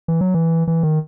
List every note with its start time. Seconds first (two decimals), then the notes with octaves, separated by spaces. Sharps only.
0.08 E3
0.21 F#3
0.34 E3
0.68 E3
0.83 D#3